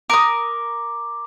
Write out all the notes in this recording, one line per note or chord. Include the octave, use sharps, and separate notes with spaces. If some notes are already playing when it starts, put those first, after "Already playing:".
A#4 D6 D#6